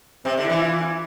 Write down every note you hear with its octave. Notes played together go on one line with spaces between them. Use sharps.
C3 C4
D3
E4
E3
E4
F4